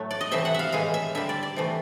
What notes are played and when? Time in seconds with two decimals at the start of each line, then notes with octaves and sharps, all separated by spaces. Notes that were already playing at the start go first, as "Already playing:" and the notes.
Already playing: A2 F#3 A3
0.11 D5
0.21 D#5
0.31 C3 E3 A3 E5
0.45 F#5
0.54 E5 F5
0.72 A2 E3 G#3 F5
0.94 E5
1.15 D3 G3 E5
1.29 D5
1.43 D5
1.56 C3 E3 A3